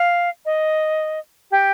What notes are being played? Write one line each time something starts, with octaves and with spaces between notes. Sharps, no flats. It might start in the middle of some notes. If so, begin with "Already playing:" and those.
Already playing: F5
D#5
G4